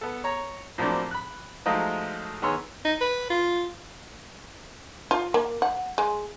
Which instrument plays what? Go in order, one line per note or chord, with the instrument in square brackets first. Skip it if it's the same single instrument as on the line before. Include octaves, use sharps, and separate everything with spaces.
[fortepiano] B3 A4
C#5 A#5
A2 F3 F#3 A#3 C4 D4
B5 F#6
F3 F#3 G#3 A3 D#4 F4
D#3 B3 G#4 C#5 C6 E6
[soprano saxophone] D#4
B4
F4
[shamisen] F4
A#3
F#5
G#3